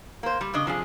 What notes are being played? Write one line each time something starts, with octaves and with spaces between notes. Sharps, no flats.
A#3 C5
G3
C#3 D4 D#5
C3 F3 D4 G#4